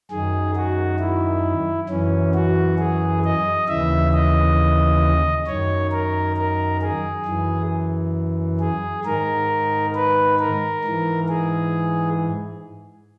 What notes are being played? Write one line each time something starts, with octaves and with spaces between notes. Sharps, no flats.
F#2 D#3 G#4
F#4
E4
F#2 E3 C#4
F#4
G#4
D#5
D#2 C#3 E3 E5
D#5
F#2 D#3 C#5
A#4
A#4
G#4
F#2 E3
G#4
G#2 D#3 A#4
B4
A#4
G#2 E3
G#4